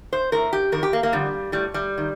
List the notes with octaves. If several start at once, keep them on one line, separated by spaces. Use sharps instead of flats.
C5
A2 A#4
G4
F2 D#3 A#4
G4
A#3
A#3
F2 D3 G3
A2 G3
G3
D#3